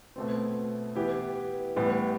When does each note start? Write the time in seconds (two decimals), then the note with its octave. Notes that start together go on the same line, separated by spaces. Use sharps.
0.16 B2 A3 C4
0.95 E3 B3 E4 G4
1.76 A2 E3 G3 B3